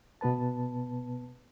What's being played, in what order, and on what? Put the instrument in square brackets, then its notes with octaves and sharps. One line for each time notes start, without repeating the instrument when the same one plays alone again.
[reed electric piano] B2 B3 B4 A5